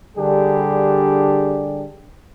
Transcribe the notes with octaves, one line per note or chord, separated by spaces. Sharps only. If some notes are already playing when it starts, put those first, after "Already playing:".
D3 G3 D4 G4 G#4